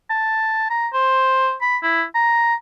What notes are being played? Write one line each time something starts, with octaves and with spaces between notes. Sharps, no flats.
A5
A#5
C5
B5
E4
A#5